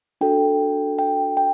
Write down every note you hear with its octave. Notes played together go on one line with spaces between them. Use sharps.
D4 F#4 A4 G5
G5
G5